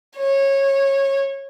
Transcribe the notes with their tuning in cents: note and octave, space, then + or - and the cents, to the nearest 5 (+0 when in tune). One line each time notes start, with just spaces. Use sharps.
C#5 -20